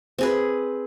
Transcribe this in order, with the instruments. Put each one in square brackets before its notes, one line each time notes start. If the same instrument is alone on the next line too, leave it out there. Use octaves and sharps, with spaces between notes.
[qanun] C4 G#4 B4